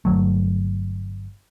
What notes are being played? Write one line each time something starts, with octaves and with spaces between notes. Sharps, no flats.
G1 F2 F#3 A3